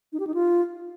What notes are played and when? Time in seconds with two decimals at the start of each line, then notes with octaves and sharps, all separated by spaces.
0.13 D#4
0.20 G4
0.27 D#4
0.34 F4